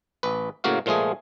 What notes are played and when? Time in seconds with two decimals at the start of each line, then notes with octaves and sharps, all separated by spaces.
0.23 A1 B4
0.64 A2 C#3 A#3 F#4 F5
0.86 A#2 F3 G#3 A3 G#4